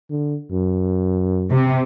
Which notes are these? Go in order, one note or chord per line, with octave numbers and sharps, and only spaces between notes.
D3
F#2
C3